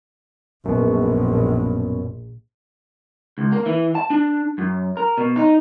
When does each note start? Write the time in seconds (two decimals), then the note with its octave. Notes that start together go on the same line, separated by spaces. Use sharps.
0.65 A#1 F#2 B2
3.38 C#2
3.52 A#3
3.66 E3
3.95 A5
4.10 D4
4.58 F#2
4.97 A#4
5.18 B2
5.36 D#4